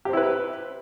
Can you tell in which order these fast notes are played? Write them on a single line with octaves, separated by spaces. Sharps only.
G4 C4 E4 B4